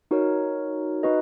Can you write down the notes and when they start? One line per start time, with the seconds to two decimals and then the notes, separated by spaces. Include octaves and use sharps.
0.11 D#4 F#4 A#4 C#5
1.03 D#4 F#4 B4 D#5